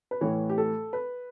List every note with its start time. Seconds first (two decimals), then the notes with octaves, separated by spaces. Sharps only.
0.11 B4
0.21 A2 E3 C#5
0.50 G4
0.58 A4
0.93 B4